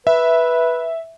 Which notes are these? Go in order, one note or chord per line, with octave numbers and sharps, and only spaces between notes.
B4 E5